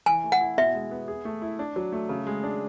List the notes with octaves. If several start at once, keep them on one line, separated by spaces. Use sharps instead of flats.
E3 G#5
A3
F#5
E4
B2 E5
G#3
B3
G#4
A3
E4
D4
F#3
A3
C#3
G#3
D4